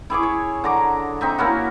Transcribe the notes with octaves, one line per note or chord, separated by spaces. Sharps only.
E4 G#4 C#5 D6
C#5
D3 A#5 D6
C4 D#4 E5
A#3 C#4 E4 F#4